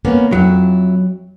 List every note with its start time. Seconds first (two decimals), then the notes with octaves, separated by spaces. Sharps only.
0.05 A#3 B3 C#4
0.32 F2 F#3 E4